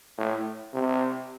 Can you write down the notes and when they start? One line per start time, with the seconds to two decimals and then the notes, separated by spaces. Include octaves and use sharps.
0.18 A2
0.73 C3